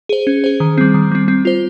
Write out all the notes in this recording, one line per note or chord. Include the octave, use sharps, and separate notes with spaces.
G#4 C5
C#4
G#4 C5
D#3
G3 C4
D#3
G3 C4
C4
F4 C5